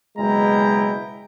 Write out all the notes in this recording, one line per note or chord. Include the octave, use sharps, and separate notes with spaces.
F#1 B2 G#3 E4 G5 A#5